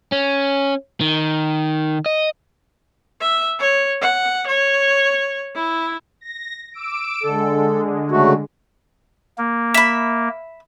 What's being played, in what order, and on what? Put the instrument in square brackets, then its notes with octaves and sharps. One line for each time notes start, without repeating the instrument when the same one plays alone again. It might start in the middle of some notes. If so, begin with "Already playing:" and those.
[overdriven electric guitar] C#4
D#3
D#5
[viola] E5
C#5
F#5
C#5
E4
[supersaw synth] A#6
D6 E6 D7
[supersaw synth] D3 G#3 [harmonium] A4
[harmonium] C#3 A3 F#4
[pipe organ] A#3
[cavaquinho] E5 B5